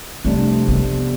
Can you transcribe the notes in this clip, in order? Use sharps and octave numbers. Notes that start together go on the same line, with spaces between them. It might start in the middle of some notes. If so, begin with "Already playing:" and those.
F2 C3 G3 A3 D4
B3